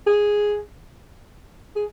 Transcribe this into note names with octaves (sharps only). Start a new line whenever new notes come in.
G#4
G#4